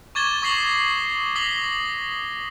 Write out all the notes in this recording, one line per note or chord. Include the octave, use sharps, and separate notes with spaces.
C#6 D6 G#6 A6 E7 G7
C#6 D#6 A#6 C7 F#7 G7
D#6 A#6 B6 F#7 G7